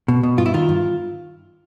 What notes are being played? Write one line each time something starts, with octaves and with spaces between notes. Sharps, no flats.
B2
B2
G2 F4
E4
D#3 F4
G2